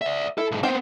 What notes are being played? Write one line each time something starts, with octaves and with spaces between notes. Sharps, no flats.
D5 E5
E4 A4
B1 G#2
B3 C4 C5 G5